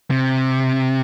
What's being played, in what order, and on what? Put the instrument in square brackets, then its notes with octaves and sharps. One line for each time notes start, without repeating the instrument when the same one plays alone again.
[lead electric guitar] C3